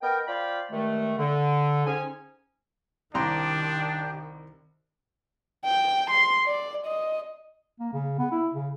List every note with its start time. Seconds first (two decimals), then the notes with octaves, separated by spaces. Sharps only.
0.02 B3 A#4 D#5 G5
0.28 C4 F4 D5 F5 G5 B5
0.70 G2 D#3 G#3 A3
1.18 D3
1.86 C4 C#4 D#4 G#4 G#5
3.14 C2 D#3 D4 G4 G5 A#5 C6
5.65 G5
6.10 C6
6.46 D5
6.86 D#5
7.80 A#3
7.93 C#3
8.19 B3
8.32 E4
8.54 C#3